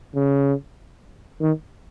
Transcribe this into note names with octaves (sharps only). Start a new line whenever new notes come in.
C#3
D#3